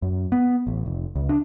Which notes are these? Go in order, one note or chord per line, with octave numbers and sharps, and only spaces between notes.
F#2
B3
A1
F1
C#2
D4